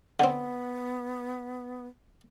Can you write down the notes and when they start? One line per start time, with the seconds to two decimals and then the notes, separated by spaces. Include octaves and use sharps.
0.20 D3 B3 C4 F#5